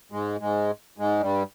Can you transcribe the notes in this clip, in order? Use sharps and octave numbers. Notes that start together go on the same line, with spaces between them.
G#2 G#3
G#2 G#3
G#2 G#3
G2 G3